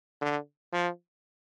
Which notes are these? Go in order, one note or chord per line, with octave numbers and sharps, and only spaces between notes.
D3
F3